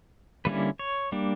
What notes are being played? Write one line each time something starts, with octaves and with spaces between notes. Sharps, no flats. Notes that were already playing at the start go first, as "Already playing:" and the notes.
D3 G3 A#3 C#4 E4 B4
C#5
G3 A#3 D4